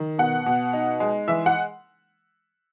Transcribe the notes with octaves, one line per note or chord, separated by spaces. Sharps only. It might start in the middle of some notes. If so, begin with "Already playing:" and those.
Already playing: D#3
B2 F#5
B2
D#4
G#3
E3 E5
F#5